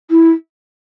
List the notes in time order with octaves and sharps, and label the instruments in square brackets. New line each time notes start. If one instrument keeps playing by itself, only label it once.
[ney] E4